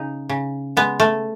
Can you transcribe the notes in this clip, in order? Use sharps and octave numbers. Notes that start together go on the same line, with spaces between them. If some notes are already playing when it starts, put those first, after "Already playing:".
Already playing: C#3 D#4
C#3
G#3 B3
A3